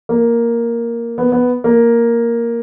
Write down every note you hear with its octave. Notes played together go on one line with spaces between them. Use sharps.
A#3
B3
B3
A#3